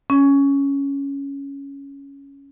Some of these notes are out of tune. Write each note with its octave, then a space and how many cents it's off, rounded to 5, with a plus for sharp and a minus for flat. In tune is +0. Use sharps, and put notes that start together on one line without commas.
C#4 +5